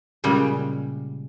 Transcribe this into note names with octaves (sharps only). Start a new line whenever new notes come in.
A#2 C#3 G3 G#3